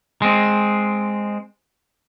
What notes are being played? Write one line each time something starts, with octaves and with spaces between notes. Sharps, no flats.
G#3 C4